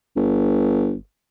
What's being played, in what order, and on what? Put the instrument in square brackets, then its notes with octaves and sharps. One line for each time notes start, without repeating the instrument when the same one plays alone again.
[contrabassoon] G1